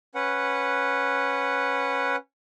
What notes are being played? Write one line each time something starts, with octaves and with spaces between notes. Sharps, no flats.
C#4 B4 F#5